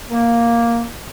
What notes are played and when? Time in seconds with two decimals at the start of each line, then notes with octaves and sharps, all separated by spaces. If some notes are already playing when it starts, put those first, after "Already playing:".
0.10 A#3